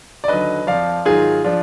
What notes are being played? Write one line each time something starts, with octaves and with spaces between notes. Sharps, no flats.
D5
D#2 D3 F#3 B4 D#5
F2 F3 D5 F5
G#2 D#3 F#3 F4 G#4
F3 D4 F4